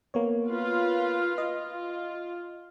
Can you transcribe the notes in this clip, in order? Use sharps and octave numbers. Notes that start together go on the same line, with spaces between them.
A#3 B3 C#5
F4 B4 F5
F4 D#5